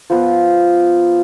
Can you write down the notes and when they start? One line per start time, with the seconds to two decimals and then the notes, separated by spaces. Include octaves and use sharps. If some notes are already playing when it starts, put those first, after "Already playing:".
0.10 F3 B3